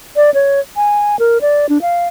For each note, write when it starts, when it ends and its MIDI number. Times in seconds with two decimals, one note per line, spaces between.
0.16 0.34 74
0.34 0.60 73
0.76 1.19 80
1.19 1.41 70
1.41 1.66 74
1.69 1.81 62
1.82 2.08 77